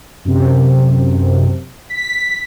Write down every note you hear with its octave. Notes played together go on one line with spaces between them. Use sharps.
F#2 C3
B6